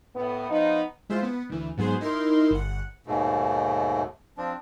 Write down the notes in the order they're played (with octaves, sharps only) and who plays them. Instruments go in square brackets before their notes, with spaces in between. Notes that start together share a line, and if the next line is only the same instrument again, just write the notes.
[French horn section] A2 B3
F3 B3 D#4
[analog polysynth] G#3 E4 F4 C5
B3
D2 E3
G#2 F#3 B3 G#4 C5
D#4 E4 A#4 C6
G1 F#5
[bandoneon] D#2 G#2 B2 A3
F3 C4 D4